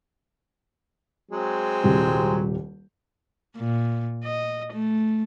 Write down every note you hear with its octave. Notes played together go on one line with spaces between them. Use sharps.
F#3 G#3 C4
D#1 C2 G4
A#2
D#5
A3